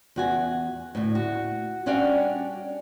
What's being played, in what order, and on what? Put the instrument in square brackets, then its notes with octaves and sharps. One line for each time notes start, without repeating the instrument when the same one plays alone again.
[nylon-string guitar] E2 F#4 G#5
D2 A2
F#4
G3 C#4 D4 F#4 D5 F5